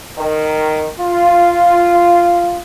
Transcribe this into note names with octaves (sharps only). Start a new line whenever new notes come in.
D#3
F4